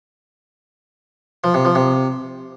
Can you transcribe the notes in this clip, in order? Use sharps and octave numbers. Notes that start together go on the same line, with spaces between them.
F3
C3
F3
C3